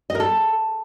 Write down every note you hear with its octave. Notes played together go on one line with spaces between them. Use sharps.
D#5
A#4
A4